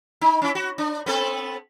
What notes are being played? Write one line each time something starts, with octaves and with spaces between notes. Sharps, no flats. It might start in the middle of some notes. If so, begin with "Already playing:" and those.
D#4
C#4 E4
F#4
D4
B3 C4 A4